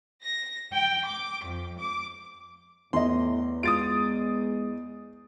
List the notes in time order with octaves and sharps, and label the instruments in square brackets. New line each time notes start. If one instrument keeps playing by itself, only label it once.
[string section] A#6
G5
D6
F2
D6
[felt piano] E2 [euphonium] A2 [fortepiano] D#5 C6
[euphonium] G#3 [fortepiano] F4 [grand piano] D#6 A6 D7